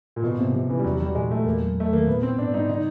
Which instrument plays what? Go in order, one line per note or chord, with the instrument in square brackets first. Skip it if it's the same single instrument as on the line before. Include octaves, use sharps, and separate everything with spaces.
[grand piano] A#2
[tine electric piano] G#2 [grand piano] B2
[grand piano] C3 [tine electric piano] A#3
[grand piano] C3 [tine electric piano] F3
[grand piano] E3 [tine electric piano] C#4
[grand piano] G3
[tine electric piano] E2 [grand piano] F#3
[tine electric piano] E3 [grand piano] G3
[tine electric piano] A#2 [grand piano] G#3
[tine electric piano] G#3 [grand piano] A3
[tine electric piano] E2 [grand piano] A#3
[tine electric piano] F#3
[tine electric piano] E2 [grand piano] A3
[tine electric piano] D#3 [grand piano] A#3
[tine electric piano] A#2 [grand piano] B3
[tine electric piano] B3 [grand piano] C4
[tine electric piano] G#2 [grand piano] D4
[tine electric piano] G3 [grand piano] D#4
[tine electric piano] C#3 [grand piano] D#4